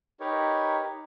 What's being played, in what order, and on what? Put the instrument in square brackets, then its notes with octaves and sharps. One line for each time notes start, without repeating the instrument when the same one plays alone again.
[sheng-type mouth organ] D#4 G4 A#4 B4 C#5